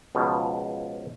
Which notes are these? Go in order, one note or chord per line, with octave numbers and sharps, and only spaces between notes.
C#2 B2 F3